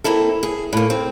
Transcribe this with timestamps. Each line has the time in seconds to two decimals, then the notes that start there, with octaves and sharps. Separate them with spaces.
0.04 A#3 C4 E4 A4
0.43 G#4
0.73 A2 A#3
0.90 C4